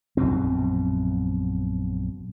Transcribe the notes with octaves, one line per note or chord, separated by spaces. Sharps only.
A#1 F#2 B2 C4